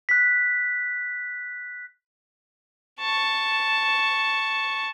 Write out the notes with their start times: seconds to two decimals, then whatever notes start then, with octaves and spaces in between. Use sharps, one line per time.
0.09 F#6 B6
3.00 A5 C#6